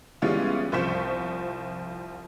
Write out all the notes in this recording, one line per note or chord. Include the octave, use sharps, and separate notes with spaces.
E3 G3 G#3 B3 C#4 F4
C2 F3 C5 C#6 B6 E7